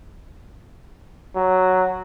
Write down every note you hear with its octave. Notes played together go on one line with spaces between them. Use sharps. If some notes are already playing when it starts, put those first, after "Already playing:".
F#3